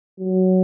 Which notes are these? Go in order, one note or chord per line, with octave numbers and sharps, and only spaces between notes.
F#3